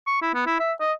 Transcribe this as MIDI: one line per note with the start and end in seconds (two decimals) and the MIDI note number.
0.07 0.21 85
0.22 0.30 64
0.34 0.44 59
0.46 0.57 64
0.59 0.73 76
0.80 0.92 75